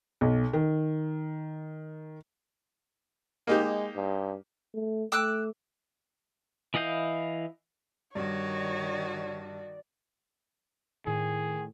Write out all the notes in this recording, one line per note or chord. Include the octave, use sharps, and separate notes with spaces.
B1
D#3
G#3 A#3 D#4 G4
G2
A3
A3 D6 E6 F#6
E3 E4 D#5 F5 G6
G2 D#3 F#4 C#5 D5
A2 D#3 G#4